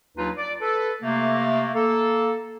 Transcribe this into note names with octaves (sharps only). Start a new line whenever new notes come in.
D#2 F#3 D4 D#4 F4 B4
D5
A4 B4
C3 A3 A#3
A#3 A4